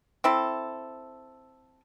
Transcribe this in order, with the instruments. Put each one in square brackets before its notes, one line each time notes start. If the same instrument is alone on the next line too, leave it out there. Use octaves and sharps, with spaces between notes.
[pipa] C4 E4 A4